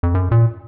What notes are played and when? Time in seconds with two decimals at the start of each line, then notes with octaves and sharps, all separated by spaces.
0.03 F2
0.15 F#2
0.31 A#2